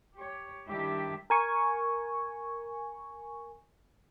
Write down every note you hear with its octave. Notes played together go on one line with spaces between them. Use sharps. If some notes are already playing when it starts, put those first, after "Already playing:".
G4 C#5
D#3 G3 D4 E4 G4 E5
A#4 G#5 C#6